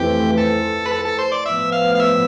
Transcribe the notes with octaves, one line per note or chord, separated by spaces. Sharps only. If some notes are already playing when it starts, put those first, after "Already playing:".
Already playing: F2 E3 A3 C4 G4
A4
B4
A4
A4
C5
D5
A2 F3 B3 E5
F5
F5
E5